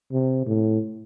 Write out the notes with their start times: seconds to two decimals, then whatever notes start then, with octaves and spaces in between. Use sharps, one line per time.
0.12 C3
0.47 A2